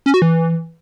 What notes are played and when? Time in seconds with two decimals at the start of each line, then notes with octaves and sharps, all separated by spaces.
0.06 C#4
0.14 F#4
0.22 E3